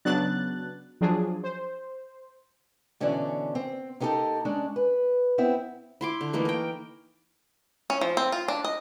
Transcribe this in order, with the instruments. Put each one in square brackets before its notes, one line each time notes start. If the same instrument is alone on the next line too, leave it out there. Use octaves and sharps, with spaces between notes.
[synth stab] C#3 F#3 B3 D4 F#6 A6
F3 F#3 D4 G#4
C5
[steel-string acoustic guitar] B2 D3 E3 C#4 E4 D5
C4
A#3 B3 D#4 G4 A4 A#4
G#3 C#4 D4 D5
B4
B3 C4 E4
[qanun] E4 C6 D6
D3
E3 A3 A#3 D#4
A#4 G5
[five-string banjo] C#4
F3
C4
F4
D4
D#5